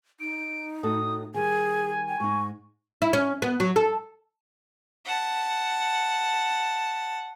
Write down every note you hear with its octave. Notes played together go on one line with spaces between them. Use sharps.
D#4 D7
A2 F#4 A4 D#6
D#3 G3 G#4 G#5
G5
G#2 D#4 C#6
E4
C#4
B3
F#3
A4
F#5 A5